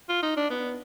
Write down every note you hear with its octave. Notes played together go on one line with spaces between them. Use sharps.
F4
D#4
D4
B3